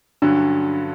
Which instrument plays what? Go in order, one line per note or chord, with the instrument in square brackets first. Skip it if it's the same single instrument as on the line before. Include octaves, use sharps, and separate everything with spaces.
[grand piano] G2 D3 F#3 C#4 [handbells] D4